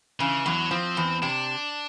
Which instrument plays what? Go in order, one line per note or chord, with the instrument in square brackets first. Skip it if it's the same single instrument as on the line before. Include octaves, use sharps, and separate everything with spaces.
[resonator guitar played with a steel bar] C#3 [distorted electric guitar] E3
[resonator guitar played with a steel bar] E2 [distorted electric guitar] F#3
[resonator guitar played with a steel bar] F3 [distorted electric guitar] C4
[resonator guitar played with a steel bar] E2
[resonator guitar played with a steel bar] C3 [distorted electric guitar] D4